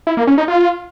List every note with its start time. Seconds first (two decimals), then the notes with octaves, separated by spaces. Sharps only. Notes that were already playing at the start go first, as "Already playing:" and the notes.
0.07 E4
0.17 A#3
0.27 C#4
0.38 D#4
0.48 F4